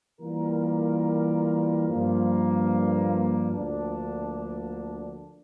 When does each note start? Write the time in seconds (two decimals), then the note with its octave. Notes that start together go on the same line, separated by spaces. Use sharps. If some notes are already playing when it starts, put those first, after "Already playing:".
0.21 E3 G3 A#3 F4 A#4
1.87 G2 F3 A#3
3.52 D2 D3 F3 A#3 D4